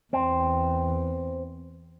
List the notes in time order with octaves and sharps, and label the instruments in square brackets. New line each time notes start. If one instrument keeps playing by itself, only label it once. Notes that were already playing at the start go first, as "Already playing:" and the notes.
[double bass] E2 [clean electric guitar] C4